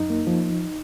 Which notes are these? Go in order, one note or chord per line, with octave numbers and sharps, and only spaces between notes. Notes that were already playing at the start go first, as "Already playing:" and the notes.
Already playing: F#2 D#4
A#3
F3